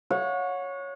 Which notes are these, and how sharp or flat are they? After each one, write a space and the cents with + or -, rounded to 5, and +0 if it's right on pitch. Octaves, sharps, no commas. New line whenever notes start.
C#5 +0 F#5 -35